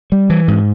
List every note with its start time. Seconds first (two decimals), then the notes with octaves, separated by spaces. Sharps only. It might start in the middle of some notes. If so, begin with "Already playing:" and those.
0.12 G3
0.30 E3
0.48 G#2